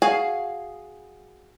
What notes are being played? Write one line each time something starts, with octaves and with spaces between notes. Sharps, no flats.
F#4 G#4 F5 G#5